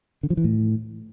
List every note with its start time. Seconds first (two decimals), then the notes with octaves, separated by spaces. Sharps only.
0.23 D3
0.30 F3
0.37 E3
0.44 A2